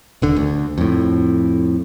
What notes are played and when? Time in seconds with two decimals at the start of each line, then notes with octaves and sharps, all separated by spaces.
0.22 D#1 D3
0.36 D2
0.78 F2 A2